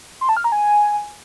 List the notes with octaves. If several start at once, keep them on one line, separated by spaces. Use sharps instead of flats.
C6
A5
F6
A#5
G#5